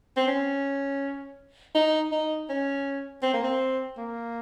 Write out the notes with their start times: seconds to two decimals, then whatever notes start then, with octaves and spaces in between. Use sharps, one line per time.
0.17 C4
0.28 C#4
1.75 D#4
2.12 D#4
2.49 C#4
3.23 C4
3.34 A#3
3.43 C4
3.97 A#3